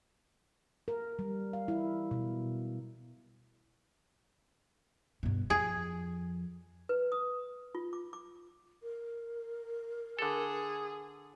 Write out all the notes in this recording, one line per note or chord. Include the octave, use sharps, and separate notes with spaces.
A#4
G3
F5
E4
B2
G2 B2
F2 G#4
B4
D#6
F4
D6
D6
A#4
D3 G#4 A4